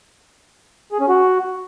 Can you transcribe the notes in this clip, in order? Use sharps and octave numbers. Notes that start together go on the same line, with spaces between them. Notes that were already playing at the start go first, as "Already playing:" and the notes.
G#4
C#4
F#4